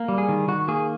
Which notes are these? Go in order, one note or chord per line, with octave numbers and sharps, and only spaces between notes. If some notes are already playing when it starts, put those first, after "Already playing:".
Already playing: A#3
G3
G#4
D#3
D#3 F#4
A#3 G#4